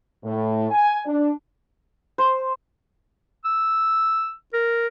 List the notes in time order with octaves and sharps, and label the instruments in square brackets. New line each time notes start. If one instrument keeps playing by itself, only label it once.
[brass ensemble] A2
G#5
D4
[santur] C5
[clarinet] E6
A#4